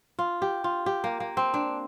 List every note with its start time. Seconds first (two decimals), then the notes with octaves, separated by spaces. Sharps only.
0.19 F4
0.42 G4
0.64 F4
0.86 G4
1.04 A#3
1.20 A#3
1.37 C4
1.54 D4